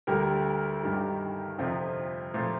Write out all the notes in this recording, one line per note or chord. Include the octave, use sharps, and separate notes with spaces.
D2 D3 G3 G4 A#4
G2 D#3 G3
F2 C3 F3
A#2 F3 A3 C4